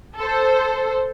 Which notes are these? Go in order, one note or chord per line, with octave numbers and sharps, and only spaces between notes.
A4 C5